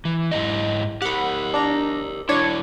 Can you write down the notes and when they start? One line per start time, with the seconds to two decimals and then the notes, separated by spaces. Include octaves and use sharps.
0.05 E3
0.32 G#2 E4 D#5
1.02 G4 A#4 F#5 B5
1.54 D4 A#5
2.29 F#3 D4 E4 C#5